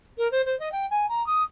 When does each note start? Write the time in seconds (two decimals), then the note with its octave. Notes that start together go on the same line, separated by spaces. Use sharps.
0.18 A#4
0.31 C5
0.46 C5
0.59 D#5
0.72 G5
0.90 G#5
1.09 A#5
1.26 D#6